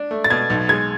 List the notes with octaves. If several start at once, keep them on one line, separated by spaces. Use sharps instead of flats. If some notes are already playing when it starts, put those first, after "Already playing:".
Already playing: D4
A3
A6
B2 G#6
B1
G#3 G#6